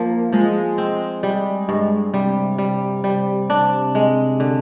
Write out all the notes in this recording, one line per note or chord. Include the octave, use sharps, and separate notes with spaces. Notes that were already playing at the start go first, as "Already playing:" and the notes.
Already playing: F3 A#3
F3 G#3
C4
G3
G2
C3 G3
G3
G3
D4
G#3
D3